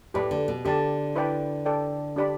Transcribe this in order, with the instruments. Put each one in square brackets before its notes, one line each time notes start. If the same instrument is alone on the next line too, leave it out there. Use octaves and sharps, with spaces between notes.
[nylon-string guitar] A2 [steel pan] G4 B4 D5 B5
[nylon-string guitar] D3
B2
[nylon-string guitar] D3 [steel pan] G4 D5 A5
[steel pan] E4 B4 D5 G5 B5
A4 D5 G5
D4 G4 D5 B5